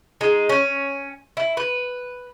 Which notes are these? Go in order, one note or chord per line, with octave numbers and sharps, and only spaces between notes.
G#3 D#4
C#4
E4
B4